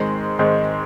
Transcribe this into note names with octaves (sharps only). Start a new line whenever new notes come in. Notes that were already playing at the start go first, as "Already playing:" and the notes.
Already playing: G#2 D#3 G#3 C4
G#2 D#3 G#3 C4